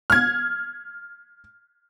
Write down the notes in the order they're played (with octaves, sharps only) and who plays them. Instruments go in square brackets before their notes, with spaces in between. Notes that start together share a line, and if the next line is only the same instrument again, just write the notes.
[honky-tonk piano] F6 G#6